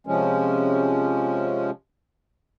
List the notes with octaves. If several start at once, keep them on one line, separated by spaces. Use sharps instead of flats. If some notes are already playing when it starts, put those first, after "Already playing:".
C3 F3 G#3 C#4